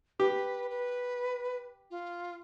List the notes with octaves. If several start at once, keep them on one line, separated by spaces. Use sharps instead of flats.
G4 B4
B4
F4